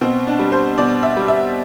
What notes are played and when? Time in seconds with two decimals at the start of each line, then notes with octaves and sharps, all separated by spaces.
0.01 B2 C4
0.27 D4
0.39 G3
0.52 C5
0.78 B2 D5
1.03 E5
1.17 G3
1.28 E5